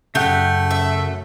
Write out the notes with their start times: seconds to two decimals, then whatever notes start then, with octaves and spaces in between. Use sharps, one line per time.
0.15 F#2 C#3 A3 G4 F#5
0.71 E5